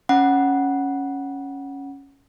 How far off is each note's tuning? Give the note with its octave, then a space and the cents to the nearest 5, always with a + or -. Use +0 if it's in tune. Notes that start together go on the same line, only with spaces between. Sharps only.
C#4 +0 F#5 +0 B5 -30